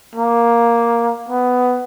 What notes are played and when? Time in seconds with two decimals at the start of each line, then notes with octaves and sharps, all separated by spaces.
0.16 A#3
1.29 B3